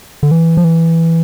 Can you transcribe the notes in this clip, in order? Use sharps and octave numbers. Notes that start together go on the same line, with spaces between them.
D3
E3
F3
E3